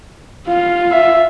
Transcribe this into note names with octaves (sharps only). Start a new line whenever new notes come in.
F4 F5
E5